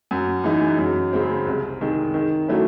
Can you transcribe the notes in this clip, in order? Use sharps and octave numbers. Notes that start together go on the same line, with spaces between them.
F#2
E3 G#3 D#4
F#2
C#3 G#3 C4
C2
C3 D#3 G#3
D#3
F#3 A3 C#4 E4